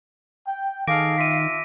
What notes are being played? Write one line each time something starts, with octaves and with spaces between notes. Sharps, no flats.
G5
D#3 G#4 A4 F5 D6 A#6 D7
F4 E5 B6 D#7